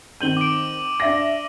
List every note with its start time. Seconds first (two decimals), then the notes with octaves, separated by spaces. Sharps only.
0.21 D#3 C4 G6 D#7 F#7 G7
0.37 D6 D7
1.00 D4 E5 A#6